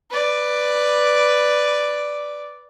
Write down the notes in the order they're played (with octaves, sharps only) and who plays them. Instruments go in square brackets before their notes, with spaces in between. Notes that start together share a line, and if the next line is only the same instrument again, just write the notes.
[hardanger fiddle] B4 D5